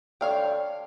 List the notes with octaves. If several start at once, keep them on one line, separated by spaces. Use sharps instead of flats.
D3 C#5 F5 G5